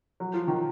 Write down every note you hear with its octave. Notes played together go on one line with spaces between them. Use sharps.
F#3
F3
D#3